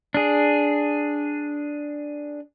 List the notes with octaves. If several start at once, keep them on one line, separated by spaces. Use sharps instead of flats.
D4 G#4